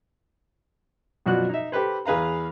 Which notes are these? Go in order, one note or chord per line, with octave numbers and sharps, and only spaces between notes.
F#2 B2 F3 F#4 D5 F#6
D#4 E5
G4 A4 B4 C5
E2 G#4 B4 F5 A#5